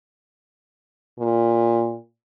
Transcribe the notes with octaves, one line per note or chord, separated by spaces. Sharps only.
A#2